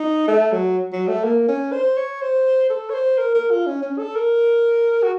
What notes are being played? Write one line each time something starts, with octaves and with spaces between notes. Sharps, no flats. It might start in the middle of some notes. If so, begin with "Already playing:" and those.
Already playing: D#4
A3
F#3
F#3
A3
A#3
C#4
C5
C#5
C5
A4
C#5
C5
A#4
A#4
F4
C#4
C#4
A4
A#4
F#4